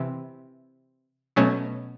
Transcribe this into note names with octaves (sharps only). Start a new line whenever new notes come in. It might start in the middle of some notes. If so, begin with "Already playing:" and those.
Already playing: C3 E3
B2 F#3 A3 C#4